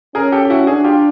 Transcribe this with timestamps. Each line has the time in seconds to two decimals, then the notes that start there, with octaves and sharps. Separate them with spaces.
0.15 C#4 G#4 A#4
0.32 G4 A4
0.45 G4
0.50 E4 F#4
0.67 D4 F#4 G#4
0.84 F4 G4